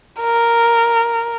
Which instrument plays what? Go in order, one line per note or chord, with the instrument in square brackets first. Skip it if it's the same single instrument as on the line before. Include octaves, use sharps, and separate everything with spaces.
[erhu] A#4